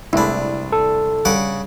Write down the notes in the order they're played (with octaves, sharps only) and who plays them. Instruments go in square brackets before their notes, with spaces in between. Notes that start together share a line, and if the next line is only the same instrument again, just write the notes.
[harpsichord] C2 D4 [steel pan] G#3 A3 E4
[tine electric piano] A4
[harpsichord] C#3 F#5 D6 [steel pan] G3